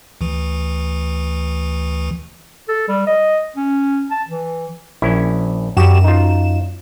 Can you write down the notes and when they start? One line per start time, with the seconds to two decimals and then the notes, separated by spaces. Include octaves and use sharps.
0.21 D2 E3
2.69 A4
2.89 G3
3.07 D#5
3.57 C#4
4.11 A5
4.28 E3
5.02 A#1 C#4 E4
5.77 F#2 F#4 G4 E7
6.04 D#4 F4